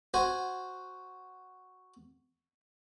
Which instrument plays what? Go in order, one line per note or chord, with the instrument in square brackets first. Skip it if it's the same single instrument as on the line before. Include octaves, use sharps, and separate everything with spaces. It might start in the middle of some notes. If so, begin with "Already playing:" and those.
[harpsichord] F#4 C5 G#5